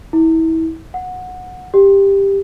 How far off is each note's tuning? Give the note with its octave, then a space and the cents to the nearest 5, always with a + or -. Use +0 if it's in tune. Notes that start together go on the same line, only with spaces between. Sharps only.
E4 -30
F#5 -15
G4 +10